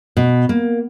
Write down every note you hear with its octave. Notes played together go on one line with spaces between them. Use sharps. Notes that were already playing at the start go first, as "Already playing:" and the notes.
B2
A#3